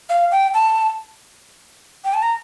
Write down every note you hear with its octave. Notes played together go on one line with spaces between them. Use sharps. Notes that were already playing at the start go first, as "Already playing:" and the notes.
F5
G5
A5
G5
A5
A#5